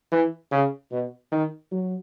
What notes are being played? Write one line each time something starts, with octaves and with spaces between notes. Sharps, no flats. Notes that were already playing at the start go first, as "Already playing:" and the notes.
E3
C#3
B2
D#3
F#3